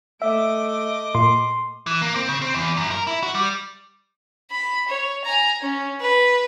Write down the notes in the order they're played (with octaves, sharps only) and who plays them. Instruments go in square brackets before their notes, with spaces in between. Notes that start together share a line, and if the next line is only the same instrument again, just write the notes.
[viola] A3 [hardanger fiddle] D#5 D6 [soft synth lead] E5
[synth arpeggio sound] A#2 [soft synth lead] C6
[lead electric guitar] E3
A#3
C4
C#3
C4
E2
F#2
A#4
E4
F#4
G3
[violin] B5
C#5
G#5 A#5
C#4
B4